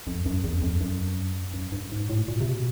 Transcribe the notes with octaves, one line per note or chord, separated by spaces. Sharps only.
F2
F#2
E2
F2
F#2
F#2
G2
G#2
A2
A#2
C3
B2